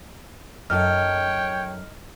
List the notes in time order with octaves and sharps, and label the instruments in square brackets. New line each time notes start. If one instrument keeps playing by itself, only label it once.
[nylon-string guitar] F#2 A4 [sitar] A3 D#4 D#5 [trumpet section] C#5 G5 [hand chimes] F6